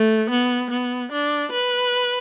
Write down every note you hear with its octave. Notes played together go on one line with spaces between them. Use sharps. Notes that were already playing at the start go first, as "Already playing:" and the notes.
Already playing: A3
B3
B3
D4
B4